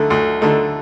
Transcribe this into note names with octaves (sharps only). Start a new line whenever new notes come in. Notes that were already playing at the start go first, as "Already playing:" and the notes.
Already playing: D2 D3 A3 D#4
D2
D3 A3 D#4